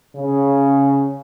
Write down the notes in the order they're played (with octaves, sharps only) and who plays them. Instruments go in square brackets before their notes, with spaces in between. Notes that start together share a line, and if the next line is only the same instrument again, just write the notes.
[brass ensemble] C#3